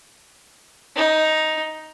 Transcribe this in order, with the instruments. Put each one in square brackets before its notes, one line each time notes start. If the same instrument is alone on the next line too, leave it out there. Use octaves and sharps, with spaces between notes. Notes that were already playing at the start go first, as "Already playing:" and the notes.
[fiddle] D#4